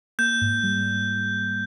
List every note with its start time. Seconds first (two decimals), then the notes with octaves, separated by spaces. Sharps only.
0.19 A#3 G6
0.41 G#2
0.63 G3